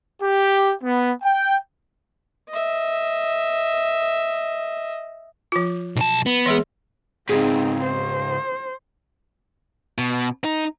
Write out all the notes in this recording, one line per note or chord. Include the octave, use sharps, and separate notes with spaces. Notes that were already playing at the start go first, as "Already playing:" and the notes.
G4
B3
G5
D#5 E5
F3 F4
B1 A5
B3
E3 G#3 G#4
C#2 G#2 C4 D#4 G#4
C5
B2
D#4